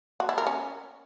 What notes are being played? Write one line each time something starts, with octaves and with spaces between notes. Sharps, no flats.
F#4
E4
A#4
C#4